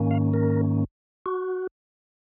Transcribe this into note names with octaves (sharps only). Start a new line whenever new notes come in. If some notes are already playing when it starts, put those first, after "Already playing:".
Already playing: G#2 D#3 A#3 C#4
F5
A#4
F#4